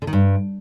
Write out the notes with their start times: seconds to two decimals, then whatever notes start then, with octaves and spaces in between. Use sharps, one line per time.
0.02 D3
0.07 D#3
0.13 G2